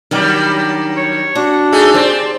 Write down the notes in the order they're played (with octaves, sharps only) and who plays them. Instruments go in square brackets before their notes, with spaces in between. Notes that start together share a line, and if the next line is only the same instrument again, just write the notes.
[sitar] D#3 F#3 G3 [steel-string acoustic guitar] D4 D#4 G5
[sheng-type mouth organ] C#5
[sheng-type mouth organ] D4 [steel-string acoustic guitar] F#4
[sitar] A3 D#4 G#4
[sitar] C4 [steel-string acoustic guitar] G4 A4 D5